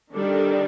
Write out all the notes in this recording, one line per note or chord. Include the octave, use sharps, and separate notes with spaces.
D#3 G3 D4 A4